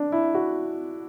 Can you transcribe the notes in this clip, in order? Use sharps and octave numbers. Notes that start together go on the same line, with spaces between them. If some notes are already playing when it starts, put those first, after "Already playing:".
Already playing: D4
E4
F#4